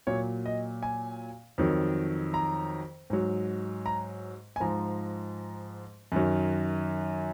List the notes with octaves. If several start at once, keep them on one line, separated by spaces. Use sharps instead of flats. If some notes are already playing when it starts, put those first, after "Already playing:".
A#2 F#3 C#5
D#5
G#5
F2 D#3 F#3
A#5
G#2 F#3
A#5
G#5
G#2 F3 A#5
F#2 D#3 F#3